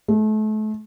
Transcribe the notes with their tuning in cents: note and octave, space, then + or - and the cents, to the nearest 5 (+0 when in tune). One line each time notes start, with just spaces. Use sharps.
A3 -35